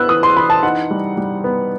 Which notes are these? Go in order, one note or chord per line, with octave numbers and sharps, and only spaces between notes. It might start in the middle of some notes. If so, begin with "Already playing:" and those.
Already playing: B3 E4 E6 F#6
E3 D#6
C6
E3 B5
A5
D#4 F#5
G3
G3
B3